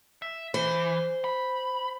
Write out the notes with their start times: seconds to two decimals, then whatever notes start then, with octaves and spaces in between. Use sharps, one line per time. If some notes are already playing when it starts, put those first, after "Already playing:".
0.22 E5
0.54 E3 C5
1.24 B5